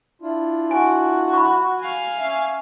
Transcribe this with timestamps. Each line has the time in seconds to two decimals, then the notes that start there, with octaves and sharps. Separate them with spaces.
0.22 D4 E4 F4
0.71 F#4 G#5
1.34 B5 C#6
1.81 F5 G#5
2.18 C#4 E5